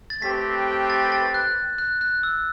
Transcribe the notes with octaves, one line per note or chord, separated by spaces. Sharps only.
A6
A3 C4 G4 B4 B6
A6
A6
F#6
F#6
F#6
E6